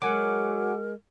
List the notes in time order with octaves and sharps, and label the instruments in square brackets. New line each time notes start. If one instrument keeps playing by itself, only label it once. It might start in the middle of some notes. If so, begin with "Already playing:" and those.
[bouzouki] F#3 [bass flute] G#3 [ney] A#4 [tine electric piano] F#5 G#5 D6